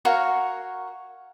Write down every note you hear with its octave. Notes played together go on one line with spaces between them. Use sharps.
F#4 A#4 C#5 F5